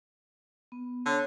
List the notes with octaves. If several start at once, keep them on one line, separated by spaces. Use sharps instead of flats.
B3
D3 C#5